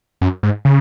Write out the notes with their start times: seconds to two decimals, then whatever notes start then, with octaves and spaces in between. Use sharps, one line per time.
0.21 F#2
0.43 G#2
0.65 C#3